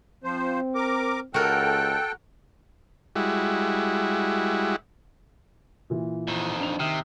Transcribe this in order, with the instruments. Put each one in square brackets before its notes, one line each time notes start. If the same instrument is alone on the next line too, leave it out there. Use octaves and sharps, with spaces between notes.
[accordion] F3 C5 [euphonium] C4
[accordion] A#4 D6
[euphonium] C#2 [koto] F#4 A#4 [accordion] A4 G5 [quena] F#6
[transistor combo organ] G3 G#3 E4 F#4
[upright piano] A#2 E3
[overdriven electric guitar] F2 D#3
[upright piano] D4 F7
[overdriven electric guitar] C3 [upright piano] D#3 D#6 F6